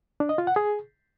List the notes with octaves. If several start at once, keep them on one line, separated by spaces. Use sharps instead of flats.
D4
D#5
F4
F#5
G#4